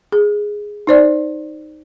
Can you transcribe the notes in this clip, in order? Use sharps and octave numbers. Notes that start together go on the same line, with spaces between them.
G#4
D#4 C5 D5